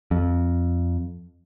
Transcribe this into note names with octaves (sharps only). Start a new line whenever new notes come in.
F2